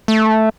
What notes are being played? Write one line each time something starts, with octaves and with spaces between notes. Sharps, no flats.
A3